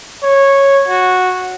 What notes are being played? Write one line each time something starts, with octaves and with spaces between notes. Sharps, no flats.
C#5
F#4